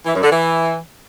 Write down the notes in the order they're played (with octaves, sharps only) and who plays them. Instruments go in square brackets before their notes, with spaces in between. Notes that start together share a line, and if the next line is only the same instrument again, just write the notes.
[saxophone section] E3
F#2
D3
E3